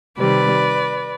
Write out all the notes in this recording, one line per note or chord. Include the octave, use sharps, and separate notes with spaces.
C3 D#3 G3 B4 D5